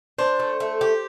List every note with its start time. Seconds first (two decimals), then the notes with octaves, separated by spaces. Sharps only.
0.18 D4 C5
0.39 A3
0.60 A3
0.81 G4